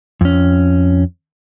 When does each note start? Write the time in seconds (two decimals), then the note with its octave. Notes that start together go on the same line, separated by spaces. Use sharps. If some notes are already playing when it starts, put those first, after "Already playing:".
0.21 F2 C#4